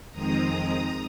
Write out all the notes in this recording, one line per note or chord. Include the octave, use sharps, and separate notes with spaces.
F2 D#3 G#3 C4 A#5 D#6